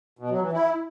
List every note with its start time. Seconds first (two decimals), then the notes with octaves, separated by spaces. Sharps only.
0.19 B2
0.30 F#3
0.42 E3
0.53 E4